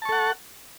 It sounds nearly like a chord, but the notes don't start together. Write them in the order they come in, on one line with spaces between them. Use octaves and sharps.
A5 C#6 A4 F#5